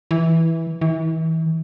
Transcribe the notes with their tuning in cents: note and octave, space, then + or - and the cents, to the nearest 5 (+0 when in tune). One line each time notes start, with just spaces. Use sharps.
E3 -10
E3 -35